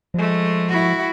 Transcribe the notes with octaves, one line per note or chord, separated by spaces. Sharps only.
F3 G#3 A3
E4 F#4